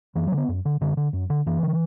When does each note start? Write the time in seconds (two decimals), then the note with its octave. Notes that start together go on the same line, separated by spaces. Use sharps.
0.15 F#2 E3
0.27 F#3
0.32 D3
0.38 B3
0.49 F#2
0.65 D3
0.81 F#2 D3
0.97 D3
1.13 F#2
1.30 D3
1.46 F#2 E3
1.63 D3